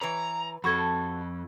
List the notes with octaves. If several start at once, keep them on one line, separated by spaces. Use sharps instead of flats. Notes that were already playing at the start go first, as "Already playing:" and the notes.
E3 B4 C#5 A#5
F2 F#4 A4 B5 C#6 G#6